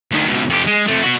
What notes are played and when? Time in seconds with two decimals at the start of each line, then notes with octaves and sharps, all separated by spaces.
0.11 D2 D#3
0.27 C#2 B2
0.50 F2 G4
0.67 G#3
0.87 C3 A3
1.03 B3 F#4